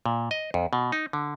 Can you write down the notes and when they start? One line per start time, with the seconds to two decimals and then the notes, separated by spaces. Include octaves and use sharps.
0.06 A#2
0.31 D#5
0.54 F2
0.73 B2
0.92 D#4
1.13 D3